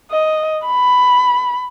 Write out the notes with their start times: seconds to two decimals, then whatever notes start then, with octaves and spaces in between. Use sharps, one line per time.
0.11 D#5
0.67 B5